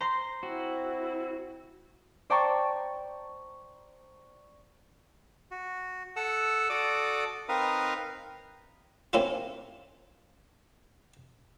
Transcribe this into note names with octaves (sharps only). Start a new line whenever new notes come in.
C5 A#5 C6
C4 E4 F#4
C5 D5 G5 A5 A#5 C#6
F#4
A4 F#5 E6
F#4 A4 D5 D6 D#6
C4 D#4 A#4 B4 F5 D#6
A#3 C4 C#4 E4 F4